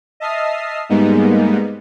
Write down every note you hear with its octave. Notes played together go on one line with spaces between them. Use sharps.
D#5 E5 A5 D#6 F6 C7
G#2 G3 G#3 A#3 B3 D#4